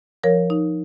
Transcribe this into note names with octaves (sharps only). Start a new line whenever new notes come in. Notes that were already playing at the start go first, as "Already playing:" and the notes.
F3 A#4 C#5
D#4